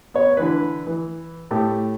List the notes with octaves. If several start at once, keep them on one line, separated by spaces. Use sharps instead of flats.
B3 C#5
D3 E3 E4 B4
E3
A2 A3 G4